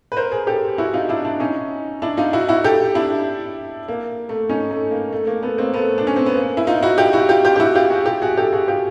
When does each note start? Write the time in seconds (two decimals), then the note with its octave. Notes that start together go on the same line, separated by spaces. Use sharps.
0.12 B4
0.17 A#4 C5
0.32 G#4 A#4
0.47 G4 A4
0.78 E4 F#4
0.93 D#4 F4
1.09 D4 E4
1.25 D4 E4
1.40 C#4 D#4
2.02 D4 E4
2.17 D#4 F4
2.33 E4 F#4
2.49 E4 F#4
2.64 G4 A4
2.95 D4 E4
3.88 A#3
4.29 A3
4.50 C#4 D#4
4.71 A3
4.91 A#3
5.13 A3
5.27 A#3
5.43 A3 B3
5.58 A#3 C4
5.74 A3 B3
5.98 D4
6.07 C#4
6.16 C4
6.26 B3
6.36 A#3
6.57 E4
6.67 D#4 F4
6.83 E4 F#4
6.98 F4 G4
7.13 E4 F#4
7.29 F4 G4
7.44 F4 G4
7.56 G4
7.60 E4 F#4
7.75 F4 G4
7.90 F#4 G#4
8.06 F4 G4
8.22 F#4 G#4
8.37 G4 A4
8.52 F#4 G#4
8.68 F4 G4